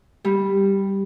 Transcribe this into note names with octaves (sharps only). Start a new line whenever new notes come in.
G3